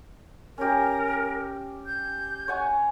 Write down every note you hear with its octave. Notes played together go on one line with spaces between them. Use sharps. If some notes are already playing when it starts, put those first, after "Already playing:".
C#4 G4 A#4
G6
C#5 F#5 G#5